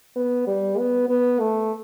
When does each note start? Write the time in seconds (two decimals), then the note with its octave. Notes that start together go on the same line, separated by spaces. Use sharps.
0.16 B3
0.47 G3
0.78 B3
1.08 B3
1.40 A3